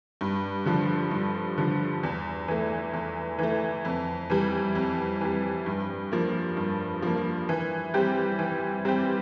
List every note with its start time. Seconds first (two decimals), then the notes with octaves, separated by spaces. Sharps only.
0.21 G2
0.66 D3 F3
1.11 G2
1.58 D3 F3
2.03 E2
2.48 E3 A3
2.93 E2
3.39 E3 A3
3.85 F2
4.30 E3 G3
4.75 F2
5.21 E3 G3
5.66 G2
6.12 F3 A#3
6.57 G2
7.02 F3 A#3
7.49 E3
7.94 G3 C4 G4
8.39 E3
8.85 G3 C4 G4